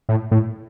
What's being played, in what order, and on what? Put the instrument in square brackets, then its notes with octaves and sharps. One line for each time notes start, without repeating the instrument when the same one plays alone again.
[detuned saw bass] A2
A2